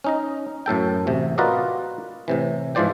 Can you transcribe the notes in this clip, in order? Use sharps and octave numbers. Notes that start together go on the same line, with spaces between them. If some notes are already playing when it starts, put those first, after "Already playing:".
C#4 D#4 D#5
F#2 A2 A4 G5
A1 C3
F4 F#4 A#4 B4 D5 D#5
A2 C3 E3
G#2 E3 F3 C5 D5 G5